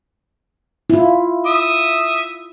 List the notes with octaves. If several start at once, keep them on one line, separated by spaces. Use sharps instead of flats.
E4 F4
E5 D#6